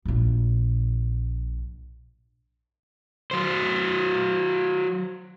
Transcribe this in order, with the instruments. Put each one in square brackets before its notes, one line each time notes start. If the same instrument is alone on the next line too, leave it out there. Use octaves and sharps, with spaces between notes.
[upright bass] A#1 A#2
[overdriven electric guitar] F#3 C5